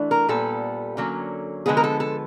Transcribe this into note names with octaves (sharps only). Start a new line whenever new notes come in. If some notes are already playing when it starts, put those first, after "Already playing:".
Already playing: E3 A3 D4
A#4
A#2 G3 B3 A4
D3 F#3 A#3 C#4
D3 F3 G#3 B3 G#4
A#4
A4
A4